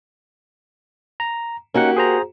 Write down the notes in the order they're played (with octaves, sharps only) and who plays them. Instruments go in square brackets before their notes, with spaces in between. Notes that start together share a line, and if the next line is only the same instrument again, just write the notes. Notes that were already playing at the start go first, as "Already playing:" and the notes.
[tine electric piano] A#5
[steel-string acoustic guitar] A#3 F#4 G4 [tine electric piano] C#4 D#4 F#5
[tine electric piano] G#4 C5 A#5